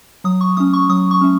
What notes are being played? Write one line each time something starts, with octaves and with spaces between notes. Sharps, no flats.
F#3 D#6
C#6
A3 C#4 D#6
C#6
F#3 D#6
C#6
A3 C#4